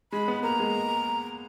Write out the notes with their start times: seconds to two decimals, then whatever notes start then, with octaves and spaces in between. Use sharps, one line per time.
0.12 G#3 B5
0.28 B3
0.43 A#3 A#5
0.59 G#3